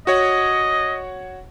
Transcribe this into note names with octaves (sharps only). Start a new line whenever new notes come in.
F#4 C#5 D#5 F#5